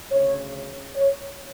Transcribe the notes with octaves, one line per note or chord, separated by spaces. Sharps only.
D2 C#3 C#5
C#5